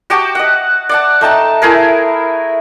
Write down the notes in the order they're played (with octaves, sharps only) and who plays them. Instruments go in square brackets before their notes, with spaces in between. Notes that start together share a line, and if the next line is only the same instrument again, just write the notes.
[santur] F#4 G4 G5 A5
D#5 F#5
D5 F#5 A5
A3 D#4 G5 A5
A3 E4 G#4 A#4